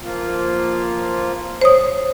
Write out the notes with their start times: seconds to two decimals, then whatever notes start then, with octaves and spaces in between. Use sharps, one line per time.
0.01 F3 A#3 F4
1.61 C5 C#5 D#6